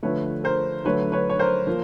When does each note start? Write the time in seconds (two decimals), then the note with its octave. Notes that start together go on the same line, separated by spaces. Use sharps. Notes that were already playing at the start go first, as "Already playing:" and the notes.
0.03 D3 F3 A3 B4 C#5
0.44 A#4 C5
0.85 D3 F#3 A3 B4 C#5
1.12 B4 C#5
1.30 C#5
1.39 A#4 C5
1.67 F3 A#3